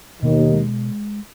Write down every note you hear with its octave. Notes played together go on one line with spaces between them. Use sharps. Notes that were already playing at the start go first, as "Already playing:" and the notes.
D#2 B2 D#3
G#3